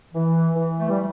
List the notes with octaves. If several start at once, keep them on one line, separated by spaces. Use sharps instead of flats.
E3
E3
A3
G3